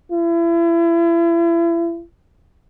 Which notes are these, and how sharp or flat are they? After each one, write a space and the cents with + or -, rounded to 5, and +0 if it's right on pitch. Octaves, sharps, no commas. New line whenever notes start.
E4 +35